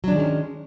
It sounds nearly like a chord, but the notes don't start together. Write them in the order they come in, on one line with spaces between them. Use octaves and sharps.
F#3 D4 D#3 G#3 C#4